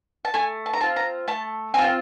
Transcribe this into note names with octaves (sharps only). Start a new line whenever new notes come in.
A5
A3 G#5
A5
A#5
C4 F4 A5
A#5
A3 A5
C4 F4 G#5
G5